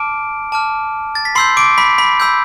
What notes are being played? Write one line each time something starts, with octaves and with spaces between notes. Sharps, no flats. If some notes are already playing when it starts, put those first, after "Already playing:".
Already playing: A5 D6 F6 D7
A5 D6 F6
A6
B6
B5 C6 E6 G6 C7
D6 D7
B5 B6
B5 B6
B5 E6 G6